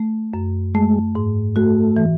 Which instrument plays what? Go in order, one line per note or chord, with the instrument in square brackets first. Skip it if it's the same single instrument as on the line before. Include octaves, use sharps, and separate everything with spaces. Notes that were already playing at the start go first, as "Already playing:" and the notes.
Already playing: [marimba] A3
F#2
[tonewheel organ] G#3 [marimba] A3
[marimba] G#2
[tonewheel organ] A3 [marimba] F#4
[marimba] E3